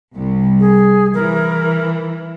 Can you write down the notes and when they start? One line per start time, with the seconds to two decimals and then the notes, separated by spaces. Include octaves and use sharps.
0.14 C2
0.60 G#4
1.14 E3 A#4